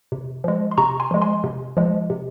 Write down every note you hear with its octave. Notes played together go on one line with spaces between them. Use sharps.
C3
F3 G#3
C6
C3 A#5 C#6
G#5 C6
F3 G#3
G#5 C6
C3
F3 G#3
C3